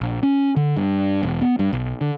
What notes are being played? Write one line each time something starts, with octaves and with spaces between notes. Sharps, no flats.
A#1
C#4
D3
G2
E1
B3
G2
B1
D3